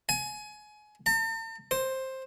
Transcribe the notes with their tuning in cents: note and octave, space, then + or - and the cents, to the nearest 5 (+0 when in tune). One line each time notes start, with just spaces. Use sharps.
G#5 +25
A5 +45
C5 +10